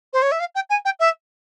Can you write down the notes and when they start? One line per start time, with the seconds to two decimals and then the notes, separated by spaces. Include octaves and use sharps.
0.13 C5
0.22 C#5
0.32 E5
0.40 F5
0.55 G5
0.70 G#5
0.85 G5
1.00 E5